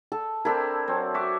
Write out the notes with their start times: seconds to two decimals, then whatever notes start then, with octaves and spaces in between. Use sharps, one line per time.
0.12 A4
0.45 C4 D4 E4 A4 A#4
0.88 F#3 C4
1.14 F#4 E5 D6